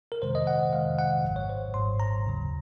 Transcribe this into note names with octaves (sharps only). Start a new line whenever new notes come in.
A#4
F2 C3 D#3 G#3 C5
D#5
F#5
D#5
F2 C3 D#3 G#3 F5
F#5
G#1 G#2 F#3
C#5
C5
G#1 G#2 F#3 C6
A#5
D#2 C#3 F#3